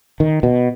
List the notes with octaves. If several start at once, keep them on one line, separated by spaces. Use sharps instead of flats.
D#3
B2